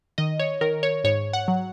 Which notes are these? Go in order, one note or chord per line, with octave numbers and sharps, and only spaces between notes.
D#3 D#5
C#5
D#3 A#4
C#5
G#2 C#5
F#5
F#3